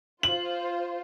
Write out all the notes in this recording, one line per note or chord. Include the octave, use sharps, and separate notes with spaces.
F4 C5 F#7